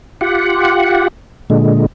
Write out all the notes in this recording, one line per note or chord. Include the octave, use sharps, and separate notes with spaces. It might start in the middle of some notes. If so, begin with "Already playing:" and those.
F4 G4 F#5
A#2 D3 G#3